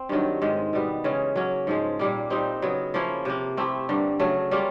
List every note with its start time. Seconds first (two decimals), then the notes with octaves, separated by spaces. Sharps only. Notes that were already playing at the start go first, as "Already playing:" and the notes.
Already playing: C4
0.09 G2 D#3 F#3
0.42 G#2 D#3 G#3
0.73 B2 G3 B3
1.04 C#3 E3 G#3 C#4
1.36 F#3 A#3 C#4
1.67 G#2 F3 G#3
1.99 A#2 G3 A#3
2.30 A#2 G3 C4 D#4
2.62 C#3 F#3 B3
2.94 F3 A#3 C#4 E4
3.25 C3 F3 A#3
3.57 A3 C4 E4 G4
3.89 G2 D3 G3 A#3
4.20 C#3 F#3 A3
4.51 G3 A#3 C#4 F4